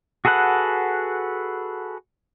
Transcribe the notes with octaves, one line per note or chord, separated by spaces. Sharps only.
F#4 G#4 A4 B4 F#5